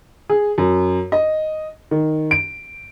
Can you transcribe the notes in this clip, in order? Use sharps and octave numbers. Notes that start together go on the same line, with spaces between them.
G#4
F#2
D#5
D#3
D7